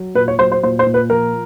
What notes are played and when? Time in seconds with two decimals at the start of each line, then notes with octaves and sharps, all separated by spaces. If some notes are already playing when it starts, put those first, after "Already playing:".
Already playing: F#3
0.15 A#2 B4
0.28 C#5
0.39 F#3 C5
0.52 C5
0.63 A#2 C5
0.79 C5
0.87 A#2
0.94 B4
1.10 F3 A#4